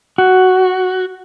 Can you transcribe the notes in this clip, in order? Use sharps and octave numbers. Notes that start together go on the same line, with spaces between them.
F#4